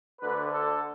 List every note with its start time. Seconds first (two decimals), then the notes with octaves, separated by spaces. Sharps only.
0.21 D2 D3 B4
0.52 A4